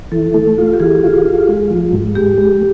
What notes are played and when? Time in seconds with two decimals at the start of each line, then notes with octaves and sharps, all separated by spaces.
0.12 E3 A4
0.34 A3
0.58 F4
0.73 G4
0.80 E3 G#4
1.03 F4
1.25 F4
1.49 G#3
1.70 F3
1.93 G#2
2.15 G#3 G4
2.38 G#3